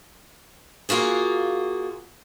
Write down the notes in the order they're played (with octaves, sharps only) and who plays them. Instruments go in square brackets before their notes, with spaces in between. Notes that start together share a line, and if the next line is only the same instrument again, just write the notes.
[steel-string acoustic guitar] A#3 F4 F#4 G#4